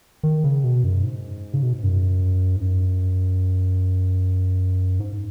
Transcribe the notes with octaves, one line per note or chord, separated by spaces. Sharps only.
D#3
C#3
B2
F#2
G#2
C#3
B2
G#2
F#2
G#2
F#2
G#2